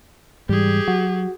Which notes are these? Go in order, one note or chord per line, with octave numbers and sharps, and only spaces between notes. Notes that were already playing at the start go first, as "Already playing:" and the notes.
G#2 E3 G3 G4 G#4
F#3 F#4